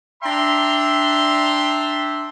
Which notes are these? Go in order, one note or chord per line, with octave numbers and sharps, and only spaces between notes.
D4 E5 G5 A#5 C6